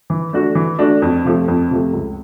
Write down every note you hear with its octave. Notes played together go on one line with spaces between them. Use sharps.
E3
A3 D4 F#4
E3
A3 D4 F#4
F2
C3 F3 A3
F2
C3 F3 A3
C#2